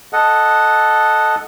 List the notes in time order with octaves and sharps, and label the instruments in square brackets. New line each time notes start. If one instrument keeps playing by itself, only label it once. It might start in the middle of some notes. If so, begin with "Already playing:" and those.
[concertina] A4 D#5 F#5